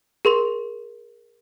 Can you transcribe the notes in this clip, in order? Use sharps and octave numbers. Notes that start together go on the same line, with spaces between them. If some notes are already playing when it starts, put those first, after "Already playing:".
G#4 A#4 C6 F7